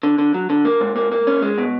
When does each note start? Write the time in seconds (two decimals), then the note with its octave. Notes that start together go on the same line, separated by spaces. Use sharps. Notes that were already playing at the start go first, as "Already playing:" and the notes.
0.03 D3
0.18 D3
0.34 F#3
0.50 D3
0.65 A#3
0.81 G#2
0.96 A#3
1.12 A#3
1.27 C#4
1.42 G#3
1.58 B2